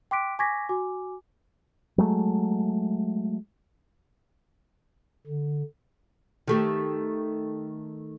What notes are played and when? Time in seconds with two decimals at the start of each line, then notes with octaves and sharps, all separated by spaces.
0.11 G5 C6 D6 F#6 B6 D7
0.39 G#5 C#6 D6 G#6 A#6 B6
0.69 F#4 G#5 D6
1.98 F#3 G#3 A3
5.26 D3
6.48 D#3 A3 G4